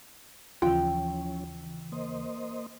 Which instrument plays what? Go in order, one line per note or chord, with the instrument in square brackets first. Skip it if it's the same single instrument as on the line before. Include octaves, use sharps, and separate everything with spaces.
[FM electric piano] D#2 C#3 E3 [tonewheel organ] F3 C#4 [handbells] F4 [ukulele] G5
[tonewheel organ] A#3 C5 D#5